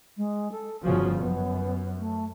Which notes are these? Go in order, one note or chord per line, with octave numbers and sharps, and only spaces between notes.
G#3
A4
G1 C#3 F3 F#4
F#2 B3
A3